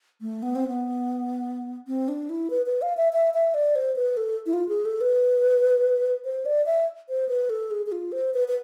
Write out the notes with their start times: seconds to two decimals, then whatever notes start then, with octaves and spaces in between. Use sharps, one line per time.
0.21 A3
0.42 B3
0.55 C4
0.68 B3
1.87 C4
2.08 D4
2.29 E4
2.50 B4
2.66 B4
2.82 F5
2.97 E5
3.13 E5
3.34 E5
3.54 D5
3.75 C5
3.96 B4
4.17 A4
4.46 E4
4.53 F4
4.69 G#4
4.85 A4
5.01 B4
6.25 C5
6.46 D5
6.66 E5
7.09 C5
7.29 B4
7.50 A4
7.71 G#4
7.86 G#4
7.92 F4
8.12 C5
8.34 B4
8.48 B4